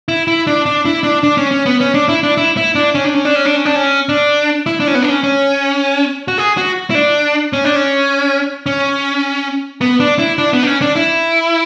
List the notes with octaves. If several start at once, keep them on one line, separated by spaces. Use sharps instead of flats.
E4
E4
D4
D4
E4
D4
D4
C#4
C#4
B3
C#4
D4
E4
D4
E4
E4
D4
C#4
D4
C#4
D4
C#4
D4
C#4
D4
C#4
D4
E4
D4
C#4
B3
D4
C#4
C#4
F#4
G#4
F#4
E4
D4
C#4
D4
C#4
C#4
B3
D4
E4
D4
B3
D4
C#4
D4
E4